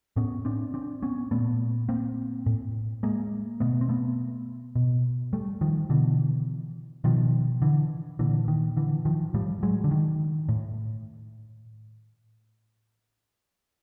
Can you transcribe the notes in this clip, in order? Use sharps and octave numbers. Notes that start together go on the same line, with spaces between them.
A2 B3 C#4
C4 D4
C4 D4
B3 C#4
A#2 A3 B3
A#3 C4
A2
G#3 A#3
B2 A3 B3
C4
A3 B3
B2
G3 A3
D#3 F3
B2 D3 E3
B2 D#3 F3
D3 E3
A#2 D3 E3
D#3
D3 E3
D#3 F3
A2 F3 G3
F#3 G#3
D3
D#3
A2